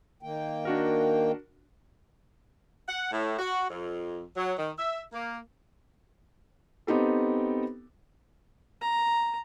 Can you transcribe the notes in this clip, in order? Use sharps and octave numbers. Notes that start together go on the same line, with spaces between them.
D#3 A#3 G5
D4 F#4 A#4
F#5
A2
F#4
F2
F#3
D#3
E5
A#3
B3 C4 D#4 G4 A4
A#5